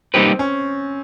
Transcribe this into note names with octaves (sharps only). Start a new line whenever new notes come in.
G3 A#3 C4 D#4 G4 B4
C#4